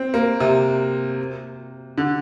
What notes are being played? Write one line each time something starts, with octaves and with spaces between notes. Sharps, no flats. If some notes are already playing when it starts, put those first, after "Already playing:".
Already playing: C4
A#3
C3
D3